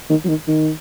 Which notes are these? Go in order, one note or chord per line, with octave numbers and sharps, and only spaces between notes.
D#3
F#3
D#3
D#3